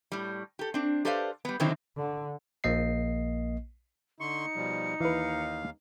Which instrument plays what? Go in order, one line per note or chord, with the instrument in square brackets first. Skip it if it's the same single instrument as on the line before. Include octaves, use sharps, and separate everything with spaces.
[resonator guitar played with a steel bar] A2 G3
G4 A4
C4 D4
G4 A4 B4 C5 D5 F5
G3 B3
B2 D3 D#3 F#3 C4 E4
[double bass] D3
[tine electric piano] A#1 A#3 D#5 C7
[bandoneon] D3 C6 C#6 [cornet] D#4 [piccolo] C#7
[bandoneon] B2 F3 G3
[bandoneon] D#2 F5 [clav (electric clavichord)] E3 B4